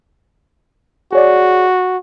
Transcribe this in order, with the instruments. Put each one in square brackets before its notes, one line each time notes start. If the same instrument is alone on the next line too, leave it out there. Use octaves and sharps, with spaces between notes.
[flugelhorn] F#4 [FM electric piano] G#4 C#5 D5